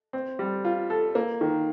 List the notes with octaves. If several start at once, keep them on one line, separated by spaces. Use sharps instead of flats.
C4
G3
F4
A4
A#3
D#3